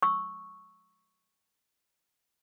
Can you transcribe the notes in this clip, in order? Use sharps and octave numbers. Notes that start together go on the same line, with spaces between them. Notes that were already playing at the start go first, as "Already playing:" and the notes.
C#6 E6